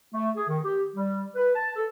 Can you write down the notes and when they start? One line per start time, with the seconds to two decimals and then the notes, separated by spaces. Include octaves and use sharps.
0.14 A3
0.36 G#4
0.48 D#3
0.64 G4
0.95 G3
1.35 B4
1.55 A5
1.76 A4